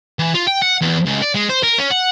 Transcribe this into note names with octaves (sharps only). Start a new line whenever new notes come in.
E3
F4
G5
F#5
E2
C#2
D5
G#3
C5
A#4
C#4
F#5